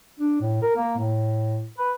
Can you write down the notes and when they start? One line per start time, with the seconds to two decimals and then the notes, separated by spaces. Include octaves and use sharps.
0.20 D4
0.41 A2
0.62 A#4
0.76 A#3
0.97 A2
1.77 B4